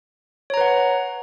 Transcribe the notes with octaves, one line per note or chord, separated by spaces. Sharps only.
B4 C#5 F#5 A#5